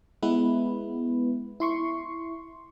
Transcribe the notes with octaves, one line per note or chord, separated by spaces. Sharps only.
G#3 B3 E4 B4
E4 C6 C#6